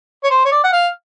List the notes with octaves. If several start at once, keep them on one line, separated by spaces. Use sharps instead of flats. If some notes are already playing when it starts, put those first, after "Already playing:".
C#5
C5
C#5
D5
F#5
F5